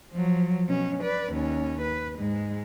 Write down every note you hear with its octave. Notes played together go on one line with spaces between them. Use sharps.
F3 F#3
B2 C#4
B4 D5
D#2 C#4
B4
G#2 G#3